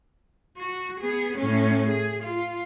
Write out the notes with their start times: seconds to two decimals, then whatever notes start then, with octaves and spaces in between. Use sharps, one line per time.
0.57 F#4
1.00 B3 G#4
1.37 A2 C#4
1.88 G#4
2.23 F4